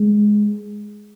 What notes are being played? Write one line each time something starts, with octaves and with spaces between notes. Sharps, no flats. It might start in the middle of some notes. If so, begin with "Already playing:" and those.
Already playing: G#3